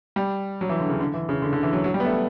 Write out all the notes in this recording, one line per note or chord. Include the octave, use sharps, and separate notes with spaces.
G3
F#3
E3
D3
C#3
D3
E3
C#3
D3
D3
E3
F#3
F#3
G3
B3
A3